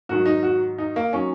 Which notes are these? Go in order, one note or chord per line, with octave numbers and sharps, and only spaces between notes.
G#2 D#3 F#3 F#4
D#4
F#4
D#4
A#3
D#3 F#3 C#4